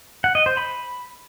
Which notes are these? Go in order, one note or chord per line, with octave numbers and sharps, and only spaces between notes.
F#5
D#5
C5
B5